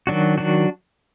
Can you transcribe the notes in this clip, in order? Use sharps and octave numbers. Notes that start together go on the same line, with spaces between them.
D#3 F#3 D4 F#4
D#3 F#3 D4 F#4